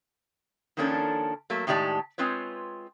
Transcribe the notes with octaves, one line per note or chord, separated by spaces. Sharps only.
D#3 F3 A#3 C#4 D4 A4
F#3 A3 A#3
A2 D#3 G#3 G4 D5 A5
G#3 C4 F4 B4 C#5